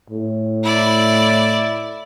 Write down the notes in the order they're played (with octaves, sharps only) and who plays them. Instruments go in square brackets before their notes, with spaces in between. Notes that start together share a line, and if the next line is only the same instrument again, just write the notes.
[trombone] A2
[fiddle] E4 D5